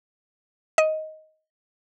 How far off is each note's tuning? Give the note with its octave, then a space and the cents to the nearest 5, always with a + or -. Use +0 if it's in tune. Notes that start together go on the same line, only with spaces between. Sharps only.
D#5 +10